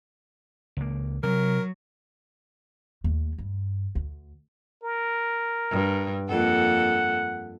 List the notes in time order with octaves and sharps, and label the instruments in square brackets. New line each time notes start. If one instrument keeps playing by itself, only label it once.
[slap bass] C#2 A#3
[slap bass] C3 [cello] F#3 [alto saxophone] A#4
[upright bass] D#2 A3
G2
D2
[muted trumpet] A#4
[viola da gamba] G2
[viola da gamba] F2 A#3 A4 [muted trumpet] F#5